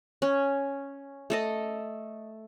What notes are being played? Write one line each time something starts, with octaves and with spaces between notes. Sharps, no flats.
C#4
A3 A4 D#5